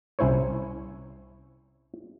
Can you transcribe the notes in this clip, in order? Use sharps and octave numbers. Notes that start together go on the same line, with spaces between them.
C2 C#4 E4 C5 C#5